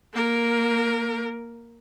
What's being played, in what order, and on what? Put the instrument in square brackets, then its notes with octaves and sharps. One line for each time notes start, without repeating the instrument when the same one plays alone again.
[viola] A#3 A#4